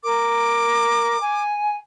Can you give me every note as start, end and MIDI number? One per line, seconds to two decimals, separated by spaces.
0.04 1.17 70
0.04 1.43 86
1.20 1.76 80